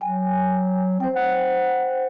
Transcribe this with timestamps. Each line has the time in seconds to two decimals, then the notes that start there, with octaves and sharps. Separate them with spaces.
0.01 F#3 G5 G#5
1.00 C4 C5 G5
1.16 F#5